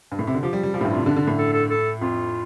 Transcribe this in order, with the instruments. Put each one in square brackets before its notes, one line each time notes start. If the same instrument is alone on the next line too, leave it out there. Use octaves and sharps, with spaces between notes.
[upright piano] G2
A2
C3
D3
[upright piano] F3 [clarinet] G4
[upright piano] G3
G3
[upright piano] F3 [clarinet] G4
[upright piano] A2
G2
[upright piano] C3 [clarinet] F4
[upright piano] D3 [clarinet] D4
[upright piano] D3 [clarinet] D4
[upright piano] A2
[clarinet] A4
A4
A4
[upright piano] F2 [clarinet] F4